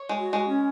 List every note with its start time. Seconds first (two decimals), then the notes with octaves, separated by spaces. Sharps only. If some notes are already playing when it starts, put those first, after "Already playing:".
Already playing: C#5
0.09 G#3
0.18 F#4
0.33 G#3
0.48 C#4